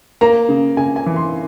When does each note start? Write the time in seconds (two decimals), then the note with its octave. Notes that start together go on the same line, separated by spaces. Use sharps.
0.21 A#3 A#5
0.49 C#3
0.77 C#3 G#5
0.96 G#5
1.06 E3
1.16 C6